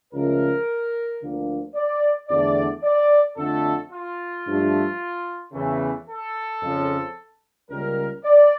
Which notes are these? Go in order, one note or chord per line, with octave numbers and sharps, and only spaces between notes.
C#2 C#3 F3 A3 A#4
D2 D3 F3 A#3
D5
E2 D3 A3 D5
D5
F2 D3 A3 A4
F4
G2 F3 A3
E2 C#3 E3 A3
A4
F2 C#3 F3
C#2 C#3 G3 A#3 A#4
D5